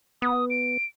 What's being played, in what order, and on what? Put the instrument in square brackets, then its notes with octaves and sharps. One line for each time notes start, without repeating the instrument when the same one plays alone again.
[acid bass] B3 [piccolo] D#6
[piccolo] D7